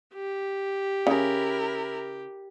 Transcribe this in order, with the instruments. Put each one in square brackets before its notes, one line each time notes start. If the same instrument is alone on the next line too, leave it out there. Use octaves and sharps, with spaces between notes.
[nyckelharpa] G4
[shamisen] C#3 [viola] E4 A#4